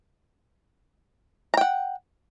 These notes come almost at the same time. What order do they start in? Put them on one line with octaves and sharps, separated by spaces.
A#5 G5 F#5